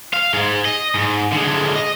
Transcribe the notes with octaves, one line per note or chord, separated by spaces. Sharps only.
F5
G#2 G#3
D#5
G#2
D3 G#3
D#5